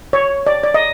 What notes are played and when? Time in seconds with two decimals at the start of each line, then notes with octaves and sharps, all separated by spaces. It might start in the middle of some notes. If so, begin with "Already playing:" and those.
0.13 C#5
0.47 D5
0.64 D5
0.74 D#5